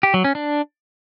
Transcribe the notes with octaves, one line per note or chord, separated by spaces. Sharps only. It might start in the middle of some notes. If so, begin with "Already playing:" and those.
G4
F#3
C#4
D4